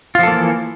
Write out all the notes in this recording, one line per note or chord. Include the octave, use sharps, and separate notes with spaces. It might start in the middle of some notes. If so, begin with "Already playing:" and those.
E3 F3 A#3 F4 A4